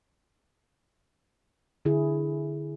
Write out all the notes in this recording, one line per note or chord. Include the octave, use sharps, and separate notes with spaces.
D3 E4 G#4